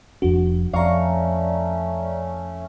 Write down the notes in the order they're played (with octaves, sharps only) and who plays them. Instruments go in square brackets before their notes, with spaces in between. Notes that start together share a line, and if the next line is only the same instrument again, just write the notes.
[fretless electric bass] F1 F2 D4 [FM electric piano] F#4
[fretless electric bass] F2 [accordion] A3 C#4 [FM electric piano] D5 A#5 [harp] F5 C#6